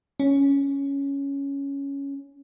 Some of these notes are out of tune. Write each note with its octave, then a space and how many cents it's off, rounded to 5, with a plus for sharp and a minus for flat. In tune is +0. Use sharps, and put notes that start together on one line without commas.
C#4 +5